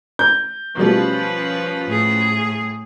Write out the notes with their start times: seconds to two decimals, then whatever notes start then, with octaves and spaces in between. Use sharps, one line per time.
0.19 G6
0.77 B2 F3 G3 A3 C#4 B4
1.87 A2 G#4